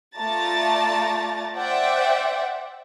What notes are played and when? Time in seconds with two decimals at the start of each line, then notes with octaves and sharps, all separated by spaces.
0.16 A3 F4 D5 A5 A#5 A6
1.56 C5 D5 E5 F#5 G5